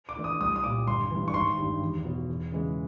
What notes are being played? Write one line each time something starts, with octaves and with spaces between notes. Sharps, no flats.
D6
E3 A3 D4
D#6
C2 D#6
D#6
A#2 G3 D6
G1 C6
G2 E3
C#6
G#1 C6
G2 D#3 G3
E2
B2 F#3
E2
C#3 E3 G#3